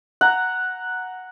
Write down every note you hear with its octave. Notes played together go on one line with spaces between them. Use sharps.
F#5 A#5